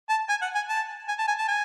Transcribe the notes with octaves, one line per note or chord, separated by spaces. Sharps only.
A5
G#5
F#5
G#5
A5
G#5
A5
G#5
A5
G#5